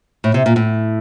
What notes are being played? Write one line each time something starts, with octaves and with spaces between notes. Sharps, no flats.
A2
C3
A#2
A2